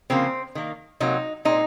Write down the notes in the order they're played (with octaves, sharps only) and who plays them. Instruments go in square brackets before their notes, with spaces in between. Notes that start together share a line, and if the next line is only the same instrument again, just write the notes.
[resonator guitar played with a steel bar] C#3 F3 A#3 C4
D#3 A#3
C3 F#3 A#3 D#4
A#2 G#3 C4 D#4